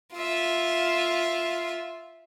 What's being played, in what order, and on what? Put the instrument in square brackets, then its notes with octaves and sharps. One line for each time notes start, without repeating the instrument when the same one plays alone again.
[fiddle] F4 E5